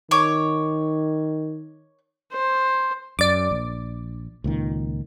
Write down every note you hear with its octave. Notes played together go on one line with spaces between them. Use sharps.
D#3 C#5 D6
C5
F#2 D5 D6
A#1
C#2 A#2 D#3